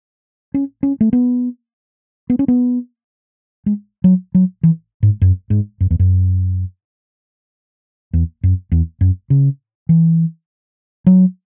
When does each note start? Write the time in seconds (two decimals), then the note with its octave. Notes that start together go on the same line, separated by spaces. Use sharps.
0.54 C#4
0.83 C#4
1.01 A3
1.13 B3
2.30 B3
2.39 C#4
2.48 B3
3.66 G#3
4.04 F#3
4.35 F#3
4.63 E3
5.03 G#2
5.22 F#2
5.50 G#2
5.81 F#2
5.91 E2
5.99 F#2
8.13 E2
8.43 F#2
8.72 E2
9.01 F#2
9.30 C#3
9.89 E3
11.07 F#3